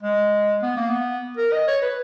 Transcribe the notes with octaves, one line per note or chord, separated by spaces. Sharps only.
G#3
B3
A#3
B3
A#4
D#5
C#5
B4